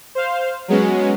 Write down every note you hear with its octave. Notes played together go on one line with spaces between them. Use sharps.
C5 F5
F#3 G#3 B3 C#4